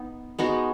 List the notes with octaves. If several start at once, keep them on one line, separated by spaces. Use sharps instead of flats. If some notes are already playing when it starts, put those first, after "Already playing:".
Already playing: B3 D#4
G#3 B3 D#4 F#4